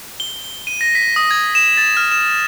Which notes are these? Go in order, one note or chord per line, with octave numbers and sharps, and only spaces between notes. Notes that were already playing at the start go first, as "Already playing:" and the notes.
G7
G7
D#7
A#6
B6
D#6
G#6
E7
A6
F6
E7